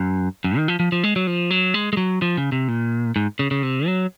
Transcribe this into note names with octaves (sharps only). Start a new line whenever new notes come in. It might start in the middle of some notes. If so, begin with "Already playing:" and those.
Already playing: F#2
F#2
D#3
F3
F3
F3
G#3
F#3
F3
F#3
G#3
G#3
F#3
F3
C#3
C3
A#2
G#2
C#3
C#3
C3
F#3